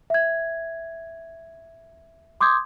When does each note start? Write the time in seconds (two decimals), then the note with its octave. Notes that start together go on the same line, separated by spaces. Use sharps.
0.10 E5 G#6
2.41 C6 D6 D#6 G6 G#6